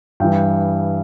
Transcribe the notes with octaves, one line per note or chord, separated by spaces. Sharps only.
G2 E3 G5